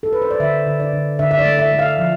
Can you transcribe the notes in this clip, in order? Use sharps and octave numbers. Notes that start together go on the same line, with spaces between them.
A4
B4
C5
D5
D3 E5
D3
D5
D3
D3 E5
E5
D5
A3
E5
A3
F5
F3